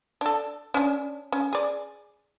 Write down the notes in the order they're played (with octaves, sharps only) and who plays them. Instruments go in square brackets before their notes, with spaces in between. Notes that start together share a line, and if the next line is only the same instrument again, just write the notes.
[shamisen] D4 A4
C#4 D4
C#4
G#4 D5